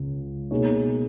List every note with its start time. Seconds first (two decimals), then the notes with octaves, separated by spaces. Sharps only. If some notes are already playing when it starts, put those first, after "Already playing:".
Already playing: C#2 C#3
0.51 B2 A#3 D#4 G#4 C#5